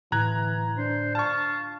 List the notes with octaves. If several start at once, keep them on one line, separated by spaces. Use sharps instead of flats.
A2 D3 E3 A#5 F#6 G#6
D4 C5
F4 A5 C#6